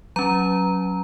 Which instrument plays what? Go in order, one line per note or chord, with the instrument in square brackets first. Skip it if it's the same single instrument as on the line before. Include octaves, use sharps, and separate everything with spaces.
[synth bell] F#3 C#4 A#5